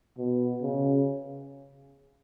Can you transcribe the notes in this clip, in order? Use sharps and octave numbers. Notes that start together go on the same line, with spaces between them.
B2
C#3